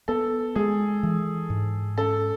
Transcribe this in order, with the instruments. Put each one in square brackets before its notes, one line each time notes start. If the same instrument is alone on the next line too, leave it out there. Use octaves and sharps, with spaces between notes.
[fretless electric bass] B3 [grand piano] A4
[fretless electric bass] G#3 [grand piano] G#4
[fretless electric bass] E3
G#2
[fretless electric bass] C#4 [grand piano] A4